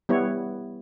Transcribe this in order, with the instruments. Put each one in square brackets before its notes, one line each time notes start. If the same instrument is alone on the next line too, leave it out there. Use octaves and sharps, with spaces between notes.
[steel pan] G3 B3 E4 C#5